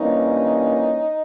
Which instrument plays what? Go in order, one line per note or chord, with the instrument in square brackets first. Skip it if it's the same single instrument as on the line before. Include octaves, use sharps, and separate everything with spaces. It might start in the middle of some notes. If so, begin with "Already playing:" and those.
Already playing: [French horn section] G2 E3 G3 A#3 C#4 D#4